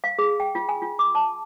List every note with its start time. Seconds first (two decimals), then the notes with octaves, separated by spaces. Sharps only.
0.04 F5
0.19 G#4
0.40 G5
0.55 F4
0.69 G#5
0.82 F4
0.99 D6
1.15 A5